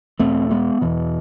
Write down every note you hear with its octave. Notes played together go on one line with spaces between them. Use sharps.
E2 B2 A3 C4
G#3 B3
E2 B2 E3